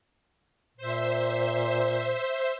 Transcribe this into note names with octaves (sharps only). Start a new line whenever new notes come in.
A#2 C5 E5